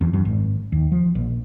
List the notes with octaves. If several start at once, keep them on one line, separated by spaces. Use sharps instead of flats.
E2
F#2
G#1
D#2
F3
A#1